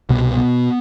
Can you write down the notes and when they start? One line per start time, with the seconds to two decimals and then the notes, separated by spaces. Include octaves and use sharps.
0.09 C2 B2 B3
0.37 B2